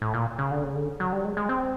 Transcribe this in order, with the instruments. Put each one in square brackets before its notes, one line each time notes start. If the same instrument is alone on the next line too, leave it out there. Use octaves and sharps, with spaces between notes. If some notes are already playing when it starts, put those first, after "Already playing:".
[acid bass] A2
A#2
C#3
D3
C#3
D3
F#3
G3
G#3
G#3
C4